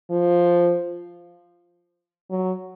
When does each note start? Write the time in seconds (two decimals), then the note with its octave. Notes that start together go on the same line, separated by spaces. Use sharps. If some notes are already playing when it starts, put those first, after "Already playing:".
0.11 F3
2.30 F#3